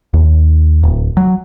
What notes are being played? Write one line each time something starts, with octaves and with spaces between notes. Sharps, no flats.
D#2
D1
F#3